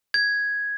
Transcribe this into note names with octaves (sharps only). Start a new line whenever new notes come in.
G#6